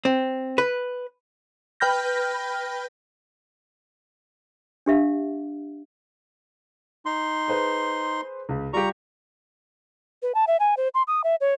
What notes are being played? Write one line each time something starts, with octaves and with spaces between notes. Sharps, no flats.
C4
B4
B4 G5 B5 F6 G6 A#6
D4 G4 E5 F5
D#4 C6
G#4 B4 C5
C#2
G3 F4 G4 A#5 C#6
B4
A5
E5
G#5
C5
C6
D#6
E5
C#5